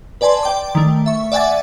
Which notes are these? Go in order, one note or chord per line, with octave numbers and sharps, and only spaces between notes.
B4 D5 G#5 A5 C6
D5 G5 D6
D#3 A3
E5 C#6
D5 E5 F#5 G#5 D6 A6